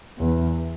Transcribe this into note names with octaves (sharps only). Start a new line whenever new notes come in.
E2